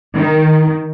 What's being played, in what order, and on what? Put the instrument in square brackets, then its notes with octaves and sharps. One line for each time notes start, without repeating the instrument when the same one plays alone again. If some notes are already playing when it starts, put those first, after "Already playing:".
[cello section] D#3